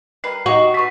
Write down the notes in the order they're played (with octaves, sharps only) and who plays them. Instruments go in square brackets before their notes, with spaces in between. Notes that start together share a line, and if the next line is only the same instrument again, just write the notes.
[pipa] G3 A#4 B4 [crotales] C7
[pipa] D#4 G4 D#5 [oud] F#4
[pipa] A3 B3 [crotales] C#6 B6